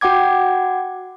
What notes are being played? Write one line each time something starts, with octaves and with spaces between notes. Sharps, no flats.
F#4 F#5 G5 D6 G#6